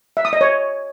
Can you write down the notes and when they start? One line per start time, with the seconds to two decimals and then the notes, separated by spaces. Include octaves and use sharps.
0.17 E5
0.25 D#6
0.33 D#5
0.41 C#5